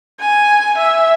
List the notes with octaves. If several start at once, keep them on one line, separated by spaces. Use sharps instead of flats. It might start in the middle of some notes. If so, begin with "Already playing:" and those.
G#5
E5